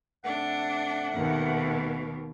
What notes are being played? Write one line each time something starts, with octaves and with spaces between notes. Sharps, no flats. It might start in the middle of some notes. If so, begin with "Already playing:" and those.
C3 A3 D4 F#5
D#2 B2